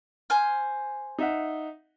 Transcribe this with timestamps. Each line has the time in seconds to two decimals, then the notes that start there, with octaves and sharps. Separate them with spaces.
0.30 C5 G#5 F6
1.19 D#4 E5 F#5